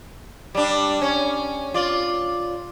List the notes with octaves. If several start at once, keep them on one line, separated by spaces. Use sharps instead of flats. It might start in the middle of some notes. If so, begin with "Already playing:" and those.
G3 D4
C#4
F4 D5